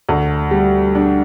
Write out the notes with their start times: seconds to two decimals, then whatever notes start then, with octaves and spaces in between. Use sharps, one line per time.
0.09 D2
0.51 G3
0.95 D4